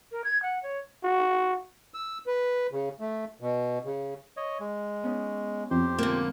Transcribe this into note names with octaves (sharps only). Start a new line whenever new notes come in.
A#4
G#6
F#5
C#5
F#4
E6
B4
C#3
A3
B2
C#3
C#5 D#5
G#3
B3 C#4 D#4
F2 G4 C5 C6
G#2 B2 D3 A#3